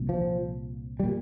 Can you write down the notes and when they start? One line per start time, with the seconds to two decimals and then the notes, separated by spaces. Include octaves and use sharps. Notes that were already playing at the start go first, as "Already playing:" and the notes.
Already playing: C2 A#2
0.09 F3
1.00 G3
1.04 A#2